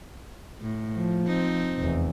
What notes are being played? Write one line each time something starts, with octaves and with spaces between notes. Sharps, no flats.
A2
F3
C4 D#4
F1 E2